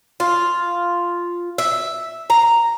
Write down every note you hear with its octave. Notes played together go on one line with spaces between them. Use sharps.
F4
E5
A#5